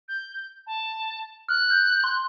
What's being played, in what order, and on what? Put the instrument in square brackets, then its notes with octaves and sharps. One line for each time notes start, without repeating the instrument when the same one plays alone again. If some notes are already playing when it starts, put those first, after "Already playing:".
[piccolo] G6
A5
[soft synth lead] F6 [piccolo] F#6
[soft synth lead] G6
C6